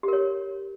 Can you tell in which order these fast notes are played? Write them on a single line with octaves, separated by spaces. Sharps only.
G4 A#4 C#5